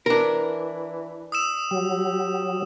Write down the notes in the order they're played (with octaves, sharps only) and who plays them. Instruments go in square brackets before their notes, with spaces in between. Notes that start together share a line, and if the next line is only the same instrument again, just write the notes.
[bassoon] E3 [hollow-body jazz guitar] D4 A#4
[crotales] D#6 E6 E7
[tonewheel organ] F#3 [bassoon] G4